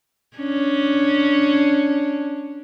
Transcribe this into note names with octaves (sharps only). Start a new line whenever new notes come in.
C#4 D4